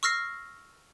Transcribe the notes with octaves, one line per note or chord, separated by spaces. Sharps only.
C#6 E6 F6 A#6 C7